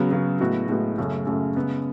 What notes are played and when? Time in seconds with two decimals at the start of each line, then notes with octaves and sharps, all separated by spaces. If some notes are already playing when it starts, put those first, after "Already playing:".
Already playing: C#3 F#3 B3
0.11 C#3 F#3 B3
0.40 A2 G#3 B3 F#4
0.68 A2 G#3 B3 F#4
0.98 F#2 C#3 F#3 A3
1.26 F#2 C#3 F#3 A3
1.56 C#3 G#3 B3